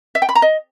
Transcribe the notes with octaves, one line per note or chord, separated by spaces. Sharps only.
E5
G5
B5
A#5
D#5